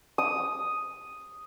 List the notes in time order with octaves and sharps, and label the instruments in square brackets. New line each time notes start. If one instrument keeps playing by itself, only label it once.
[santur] D#6